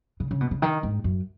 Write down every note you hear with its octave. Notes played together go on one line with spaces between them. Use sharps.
C#3
C#3
B2
C#3
D#3
G#2
F#2